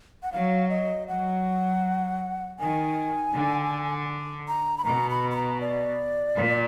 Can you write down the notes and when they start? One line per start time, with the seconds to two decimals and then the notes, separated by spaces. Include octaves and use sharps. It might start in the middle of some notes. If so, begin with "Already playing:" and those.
0.23 F#5
0.32 F#3 F5
0.70 D#5
1.08 F#3 F#5
2.59 D#3 G#5
3.34 D3
4.48 A#5
4.78 B5
4.85 B2 A#5
5.10 B5
5.31 B5
5.36 A#5
5.61 D5
6.36 A#2